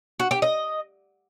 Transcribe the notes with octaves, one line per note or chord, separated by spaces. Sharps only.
F#4
G4
D#5